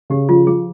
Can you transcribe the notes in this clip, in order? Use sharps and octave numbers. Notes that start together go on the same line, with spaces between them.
C#3 G4
F3 F4
F3 G#4